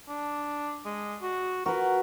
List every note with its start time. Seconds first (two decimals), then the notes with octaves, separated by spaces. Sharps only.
0.08 D4
0.85 G#3
1.22 F#4
1.66 F#4 A#4 B4